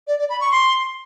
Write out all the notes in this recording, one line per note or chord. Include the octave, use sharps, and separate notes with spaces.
D5
D5
B5
C#6
C6